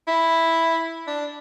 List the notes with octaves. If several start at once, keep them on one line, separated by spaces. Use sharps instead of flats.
E4
D4